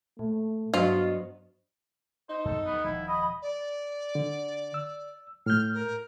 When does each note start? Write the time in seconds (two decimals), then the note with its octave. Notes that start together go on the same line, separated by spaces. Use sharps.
0.19 A#2 A3
0.74 G2 F#3 B3 D4 F4 F#4 C5 D#5
2.29 D#4 C5
2.45 F#2 B3 A4
2.66 D2 G2 B3
2.84 D#1 F3 E4
3.08 D#5 B5
3.42 D5
4.15 D3
4.74 E6
5.46 A2 F6 G6
5.74 A#4